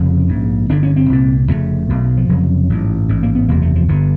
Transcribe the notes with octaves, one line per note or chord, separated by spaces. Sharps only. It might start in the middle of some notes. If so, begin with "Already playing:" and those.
Already playing: F1 F2 C#3 C#4
A#1 G#2
G1 G2 D3 D4
C#4
C4
C2 A#2
F1 D#2 C#3 A3
B1 B2
F3
F1 F2 C#3 F#3
A1 G#2
A1 G#2
A#3
B3
F#1 E2 C3 A#3
A3
F3
G1 G2 D3